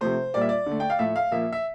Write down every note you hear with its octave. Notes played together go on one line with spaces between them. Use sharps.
C3 F3 A3 C5
A#2 G3 A#3 D5
E5
D5
D3 A3
G5
F5
A2 F3 A3 E5
F5
A#2 F3 A#3 E5
E5